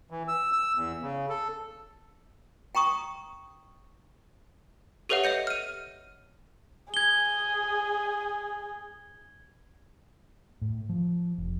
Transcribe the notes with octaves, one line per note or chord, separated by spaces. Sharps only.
E3
E6
E6
E2
C#3
A4
G5 A#5 C#6 D#6
G4 A4 B4 C#5 E5 F#5
D#5 E5 G6 C#7
F6 D#7
G#4 G#6 G7
A2
F3
F1